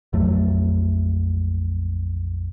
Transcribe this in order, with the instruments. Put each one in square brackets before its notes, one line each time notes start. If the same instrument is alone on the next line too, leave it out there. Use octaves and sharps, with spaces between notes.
[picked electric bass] A#1 F2 F#3 A3